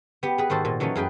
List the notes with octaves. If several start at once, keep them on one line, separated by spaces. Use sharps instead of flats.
B3 G4
G#4 B4
G#2 D#3 F#4 A4 C5
A#2
E3 F#3 A3 C#4 D#4
F#2 G#4 B4 G5